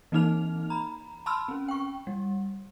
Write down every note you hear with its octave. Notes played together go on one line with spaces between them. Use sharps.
E3 A#3 C4 D#4 F6 F7
A#5 B5
A5 B5 C6 E6 F6
C4 C#4
G5 C#6
G3